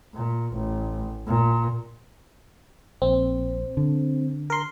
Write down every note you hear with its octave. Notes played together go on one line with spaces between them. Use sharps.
A#2
A1
A#2
A#1 C4
D3
A#4 C6